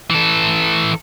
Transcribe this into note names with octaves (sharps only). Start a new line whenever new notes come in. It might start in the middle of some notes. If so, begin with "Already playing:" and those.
E3 A4